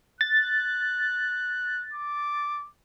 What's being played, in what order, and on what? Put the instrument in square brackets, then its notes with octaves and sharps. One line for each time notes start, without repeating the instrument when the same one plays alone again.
[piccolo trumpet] F#6 [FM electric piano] A6
[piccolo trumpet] D6